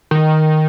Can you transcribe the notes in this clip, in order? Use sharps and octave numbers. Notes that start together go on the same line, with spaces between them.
D#3